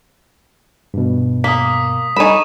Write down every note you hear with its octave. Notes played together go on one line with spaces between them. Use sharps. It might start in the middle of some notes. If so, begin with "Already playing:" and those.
G2 B2
A#3 D#6 B6
G3 D#4 A4 G#5 B5 C#6 D#7 E7